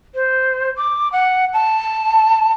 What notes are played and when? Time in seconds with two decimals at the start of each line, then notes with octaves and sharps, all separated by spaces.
0.14 C5
0.76 D6
1.12 F#5
1.53 A5